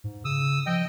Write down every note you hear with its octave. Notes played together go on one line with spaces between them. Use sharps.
G#2
C#3 D#6 E6
F3 D#5 G5